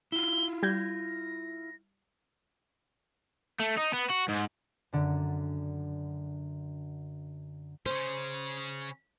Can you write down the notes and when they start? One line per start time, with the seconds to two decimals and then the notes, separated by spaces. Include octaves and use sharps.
0.12 E4 F4 G7
0.63 G3 G6 G#6 A#6
3.60 A3
3.78 D#4
3.94 B3
4.10 F#4
4.29 G#2
4.93 F#2 D3
7.86 C#3 C#4 C5